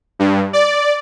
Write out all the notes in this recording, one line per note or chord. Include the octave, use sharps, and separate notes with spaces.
G2
D5